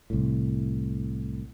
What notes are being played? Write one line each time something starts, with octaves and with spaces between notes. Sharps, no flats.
C2 A2